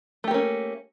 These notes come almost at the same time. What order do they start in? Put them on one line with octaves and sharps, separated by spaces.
A3 G4 A#3 C#4